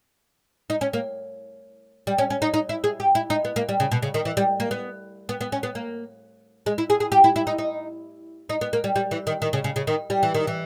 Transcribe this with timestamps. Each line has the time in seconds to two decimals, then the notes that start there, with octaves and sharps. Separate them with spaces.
0.70 D#4
0.81 C#4
0.93 A#3
2.07 G3
2.18 C#4
2.30 C#4
2.42 D#4
2.54 D#4
2.69 E4
2.84 G#4
3.00 G4
3.15 E4
3.30 D#4
3.45 B3
3.56 A#3
3.69 G3
3.80 C#3
3.91 B2
4.02 C#3
4.14 D#3
4.25 E3
4.37 G3
4.60 A#3
4.71 B3
5.29 B3
5.41 B3
5.52 C#4
5.63 B3
5.75 A#3
6.66 G#3
6.78 E4
6.90 G#4
7.00 G#4
7.12 G4
7.24 E4
7.36 E4
7.47 D#4
7.58 D#4
8.49 D#4
8.61 B3
8.73 A#3
8.84 G3
8.96 G3
9.11 E3
9.27 D#3
9.42 D#3
9.53 C#3
9.64 C#3
9.76 C#3
9.87 D#3
10.10 G3
10.23 E3
10.34 D#3
10.47 E3